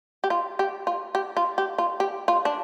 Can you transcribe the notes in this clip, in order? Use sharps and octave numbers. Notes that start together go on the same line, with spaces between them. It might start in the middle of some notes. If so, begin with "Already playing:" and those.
G4
F4
G4
F4
G4
F4
G4
F4
G4
F4
D4